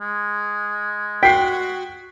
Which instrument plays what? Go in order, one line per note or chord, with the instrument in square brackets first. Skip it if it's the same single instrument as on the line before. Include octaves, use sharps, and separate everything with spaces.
[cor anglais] G#3
[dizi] F#4 [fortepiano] G5 [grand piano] B6 C7